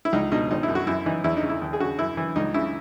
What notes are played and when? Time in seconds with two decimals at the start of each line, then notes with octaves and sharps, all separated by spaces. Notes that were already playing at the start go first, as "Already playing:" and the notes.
0.05 E4
0.13 C#2 D#4
0.32 B2 D#4
0.51 G#1 D#4
0.63 E4
0.68 F#2
0.75 F#4
0.87 F#2 E4
1.06 E3 D#4
1.24 E2 E4
1.37 D#4
1.43 C#3
1.49 E4
1.62 D#2
1.73 G#4
1.80 C#3 F#4
1.98 F#2 E4
2.17 E3
2.36 C#2 D#4
2.54 C#3 E4